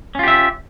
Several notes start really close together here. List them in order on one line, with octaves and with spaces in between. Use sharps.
C#4 F4 G4 E5